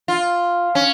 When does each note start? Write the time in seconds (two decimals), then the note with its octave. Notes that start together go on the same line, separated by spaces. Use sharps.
0.08 F4
0.75 C#4